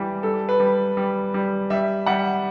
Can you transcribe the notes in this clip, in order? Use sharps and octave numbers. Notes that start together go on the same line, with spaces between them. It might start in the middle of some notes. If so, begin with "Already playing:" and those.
Already playing: E3 G3 G4
G3 A4
B4
G3
G3
G3
G3 E5
G3 F#5